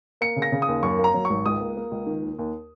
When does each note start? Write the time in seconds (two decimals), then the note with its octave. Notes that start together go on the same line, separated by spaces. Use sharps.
0.21 A#3 C#7
0.36 C#3
0.42 A#6
0.52 C#3
0.62 D#6
0.68 D#2
0.83 F#2 C#6
0.99 A#3
1.04 A#5
1.14 F#3
1.25 C#6
1.30 G#1
1.46 C#2 D#6
1.61 A#3
1.77 A#3
1.91 C#2
2.07 D#3
2.23 D#2
2.39 D#2